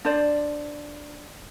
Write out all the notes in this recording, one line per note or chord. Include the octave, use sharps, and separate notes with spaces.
D4 C5 D5